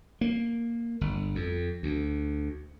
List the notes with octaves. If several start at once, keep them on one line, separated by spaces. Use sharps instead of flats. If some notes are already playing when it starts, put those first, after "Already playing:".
A#3
G1
F2
D2